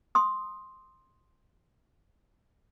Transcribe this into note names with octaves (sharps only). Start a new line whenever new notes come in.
C6 D#6